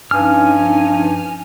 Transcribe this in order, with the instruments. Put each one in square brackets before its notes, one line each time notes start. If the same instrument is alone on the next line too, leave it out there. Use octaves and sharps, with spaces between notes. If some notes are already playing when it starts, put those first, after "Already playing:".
[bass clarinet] G2 [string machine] F3 C#4 D#4 [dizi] G#5 [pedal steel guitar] F6